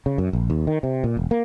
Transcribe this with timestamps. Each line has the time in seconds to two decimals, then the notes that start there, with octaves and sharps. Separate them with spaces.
0.06 C#3
0.18 F#2
0.33 A#1
0.50 D#2
0.67 D#3
0.83 C3
1.04 A#2
1.17 E1
1.31 A#3